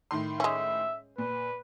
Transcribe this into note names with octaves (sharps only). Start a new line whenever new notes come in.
A2 D#3 C6
G#3 C#4 E5
A#2 B4